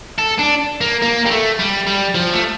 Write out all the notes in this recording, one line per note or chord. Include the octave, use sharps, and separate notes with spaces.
A4
D4
A#3
A#3
G3
A3
G3
G3
F3
A3